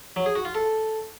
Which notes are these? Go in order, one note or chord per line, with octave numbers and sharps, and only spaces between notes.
F#3
G#4
F#4
F4
A4